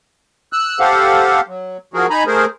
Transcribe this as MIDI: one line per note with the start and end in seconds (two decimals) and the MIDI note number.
0.53 0.79 88
0.53 0.79 90
0.80 1.40 67
0.80 1.40 69
0.80 1.40 72
0.80 1.40 77
0.80 1.40 78
1.48 1.77 54
1.94 2.07 53
1.94 2.07 66
1.94 2.07 68
1.94 2.07 70
2.10 2.24 63
2.10 2.24 80
2.10 2.24 82
2.10 2.24 83
2.27 2.46 57
2.27 2.46 68
2.27 2.46 70
2.27 2.46 72